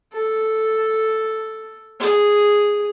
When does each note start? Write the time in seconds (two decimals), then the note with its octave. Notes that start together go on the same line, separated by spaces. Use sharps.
0.13 A4
2.00 G#4